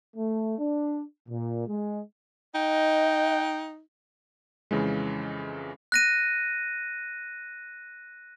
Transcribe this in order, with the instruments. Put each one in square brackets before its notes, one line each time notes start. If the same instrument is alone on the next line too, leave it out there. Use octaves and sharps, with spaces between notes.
[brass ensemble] A3
D4
A#2
G#3
[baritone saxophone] D#4 [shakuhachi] D#5 [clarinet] G5
[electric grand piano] F2 C#3 E3 G#3
[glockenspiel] F#6 A#6 D#7